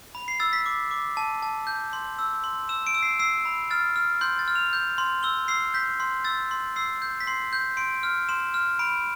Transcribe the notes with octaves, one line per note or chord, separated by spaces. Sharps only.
B5
C7
E6 A6
B6
D6
D6
A5
A5
G6
C6
E6
C6
E6 E7
D7
E6
C7
E6 C7
B5
F6 A6
F6
C6 G6
A6
F6
F7
G6
C6
E6 G7
E6 C7
G6 B6
C6
E6 A6
C6
E6 C7
G6
B6
C6 C7
G6
C6 D7
F6
C6 E7
F6
B5 D7